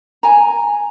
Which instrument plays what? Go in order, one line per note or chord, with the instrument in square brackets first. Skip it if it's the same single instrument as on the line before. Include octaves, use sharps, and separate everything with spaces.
[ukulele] G#5 A#5